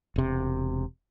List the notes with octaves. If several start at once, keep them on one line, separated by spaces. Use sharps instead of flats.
E1 C3